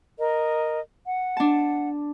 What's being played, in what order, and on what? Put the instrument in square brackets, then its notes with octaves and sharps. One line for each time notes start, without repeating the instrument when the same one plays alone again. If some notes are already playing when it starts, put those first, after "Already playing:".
[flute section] A#4 D#5
F#5
[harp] D4 A5